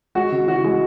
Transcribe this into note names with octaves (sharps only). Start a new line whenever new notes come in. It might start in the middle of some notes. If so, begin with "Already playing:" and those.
G#3 F#4
C#3
E3 F#4
G#3